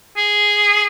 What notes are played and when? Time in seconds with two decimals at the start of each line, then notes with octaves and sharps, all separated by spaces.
0.17 G#4